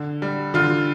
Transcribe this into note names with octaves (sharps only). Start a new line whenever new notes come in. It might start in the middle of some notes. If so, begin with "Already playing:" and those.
Already playing: D3
G3
D3 F4